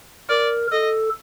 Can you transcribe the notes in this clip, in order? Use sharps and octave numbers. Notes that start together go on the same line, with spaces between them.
A#4 D5
A4 D#5